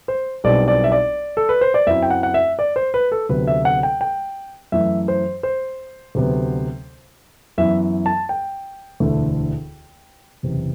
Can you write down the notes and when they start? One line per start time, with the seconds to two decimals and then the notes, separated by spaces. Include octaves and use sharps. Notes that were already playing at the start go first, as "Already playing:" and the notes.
0.08 C5
0.44 B1 B2 G3 C4 E4 D5
0.68 D5
0.84 E5
0.92 D5
1.37 A4
1.49 B4
1.61 C5
1.74 D5
1.87 F#2 F#3 C4 E4 E5
2.02 G5
2.10 F#5
2.23 F#5
2.34 E5
2.59 D5
2.76 C5
2.94 B4
3.12 A4
3.29 D2 C3 F#3 B3 B4
3.47 E5
3.65 F#5
3.83 G5
4.01 G5
4.72 F#2 E3 A3 E5
5.08 C5
5.43 C5
6.15 D2 C3 F#3 B3
7.58 F#2 E3 B3 E4 E5
8.06 A5
8.29 G5
9.00 E1 D2 D3 A3 E4
10.43 F#1 E2 C3